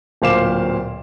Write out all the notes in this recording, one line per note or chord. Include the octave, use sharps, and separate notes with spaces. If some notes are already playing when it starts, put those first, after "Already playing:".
D1 A#2 C5 F5 D6 E7